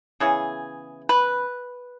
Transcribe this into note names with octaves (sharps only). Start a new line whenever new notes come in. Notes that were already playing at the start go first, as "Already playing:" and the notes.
C#3 E3 B3 G#4
B4